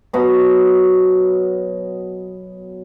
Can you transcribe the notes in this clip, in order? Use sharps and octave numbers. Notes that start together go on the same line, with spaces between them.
B2 F#3 D#5 B5